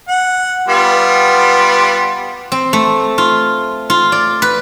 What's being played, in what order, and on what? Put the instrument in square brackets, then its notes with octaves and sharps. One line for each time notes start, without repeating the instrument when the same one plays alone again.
[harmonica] F#5
G3 B3 F4
[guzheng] C4
A3
F4
F4
D5
B4